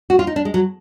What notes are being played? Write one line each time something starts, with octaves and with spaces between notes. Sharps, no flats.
F#4
F4
D#4
D4
G#3
F#3